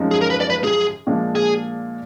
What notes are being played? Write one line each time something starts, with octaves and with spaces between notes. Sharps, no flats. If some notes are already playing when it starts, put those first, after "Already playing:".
Already playing: F#2 F3 G#3 D#4
G#4
A#4
B4
D5
B4
G#4
A#2 F3 G#3 D4
G#4